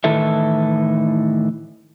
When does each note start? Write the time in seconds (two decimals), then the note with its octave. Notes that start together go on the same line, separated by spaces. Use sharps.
0.04 A2 D#3 E3 A4 E5